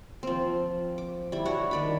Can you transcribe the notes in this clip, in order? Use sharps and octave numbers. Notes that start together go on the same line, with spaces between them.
F3 C4
D6
G3 E4
D4 F#4 C#5 F#5
D#3 D5 B5